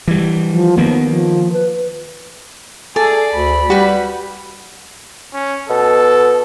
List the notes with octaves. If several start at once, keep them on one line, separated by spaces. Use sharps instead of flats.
E3 G3
F3
D#3 A#3 B3
F3
B4
G#4 A4 D5 A5
D2 B5
G3 F#4 G4 B4
C#4
B2 A4